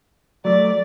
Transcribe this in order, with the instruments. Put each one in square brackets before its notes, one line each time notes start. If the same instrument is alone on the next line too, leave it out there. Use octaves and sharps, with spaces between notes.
[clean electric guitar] F#3 A3 [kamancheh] D5